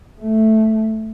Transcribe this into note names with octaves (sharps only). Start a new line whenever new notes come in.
A3